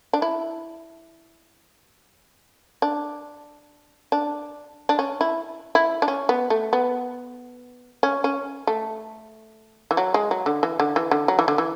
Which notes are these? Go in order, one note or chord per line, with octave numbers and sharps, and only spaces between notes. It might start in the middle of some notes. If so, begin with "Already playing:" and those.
D4
E4
D4
D4
D4
C#4
E4
E4
D4
C#4
B3
A3
B3
C#4
C#4
A3
E3
F#3
G#3
F#3
D3
E3
D3
E3
D3
F#3
E3
D3
E3